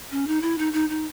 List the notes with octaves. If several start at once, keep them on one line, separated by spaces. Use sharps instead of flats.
C#4
D#4
E4
D#4
D#4
D#4